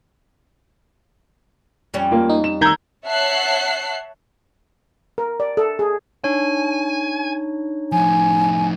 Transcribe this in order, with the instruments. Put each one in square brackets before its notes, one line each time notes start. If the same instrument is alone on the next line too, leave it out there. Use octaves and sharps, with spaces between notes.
[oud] F2 G3 C#4
[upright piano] A#3 F4
[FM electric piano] D#4
[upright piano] E7
[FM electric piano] D#3 G6 G#6 [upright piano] A#5 E6
[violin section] C#5 E5 F#5 A5 F#6 C7
[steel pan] A#4
D5
A4
G#4
[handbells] D4 C#5 [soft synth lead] D#4 [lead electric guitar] G#5
[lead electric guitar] A2 F3 [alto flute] G#5